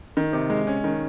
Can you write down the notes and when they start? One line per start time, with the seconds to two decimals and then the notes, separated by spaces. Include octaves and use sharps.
0.17 D#3
0.33 C3
0.50 G#3
0.67 C#4
0.84 D#3